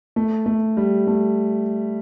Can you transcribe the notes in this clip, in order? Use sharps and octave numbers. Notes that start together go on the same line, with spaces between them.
A3
A3
G3
A3